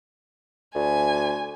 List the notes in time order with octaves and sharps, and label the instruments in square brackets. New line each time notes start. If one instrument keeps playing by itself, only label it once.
[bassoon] D2 [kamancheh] G#5